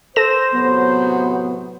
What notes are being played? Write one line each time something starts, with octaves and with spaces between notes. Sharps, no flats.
A4 C5 A#6 E7
A2 C3 F#3 B3